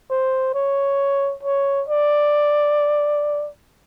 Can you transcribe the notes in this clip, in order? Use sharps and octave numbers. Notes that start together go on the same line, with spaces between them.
C5
C#5
C#5
D5